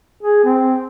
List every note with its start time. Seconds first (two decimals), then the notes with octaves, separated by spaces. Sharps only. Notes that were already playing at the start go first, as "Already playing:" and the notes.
0.23 G#4
0.45 C4